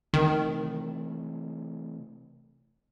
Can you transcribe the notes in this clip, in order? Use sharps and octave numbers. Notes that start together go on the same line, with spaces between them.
C3 D#3 E3 A3